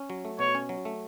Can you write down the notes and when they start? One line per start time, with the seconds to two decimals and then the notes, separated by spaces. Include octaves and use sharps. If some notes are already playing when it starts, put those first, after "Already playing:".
Already playing: C#4
0.10 F#3
0.25 A3
0.39 B2 C#5
0.55 C#4
0.69 F#3
0.85 A3